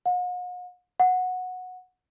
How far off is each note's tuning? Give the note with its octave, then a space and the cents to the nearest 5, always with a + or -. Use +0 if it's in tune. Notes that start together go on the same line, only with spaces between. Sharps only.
F#5 -45
F#5 -10